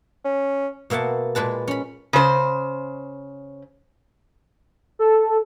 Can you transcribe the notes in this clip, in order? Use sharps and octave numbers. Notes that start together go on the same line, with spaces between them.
C#4
B2 A#3 E5 F#5 A5
A#2 G#3 B4 A5
C#4 B5
C#3 C5
A4